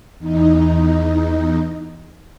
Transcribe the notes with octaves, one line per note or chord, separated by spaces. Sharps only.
E2 D#4